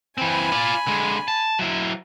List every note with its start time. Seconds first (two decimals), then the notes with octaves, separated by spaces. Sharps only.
0.18 E3 C4 G#5 B5
0.52 F4 D5
0.87 D3 G#3
1.28 A5
1.59 F#3 E4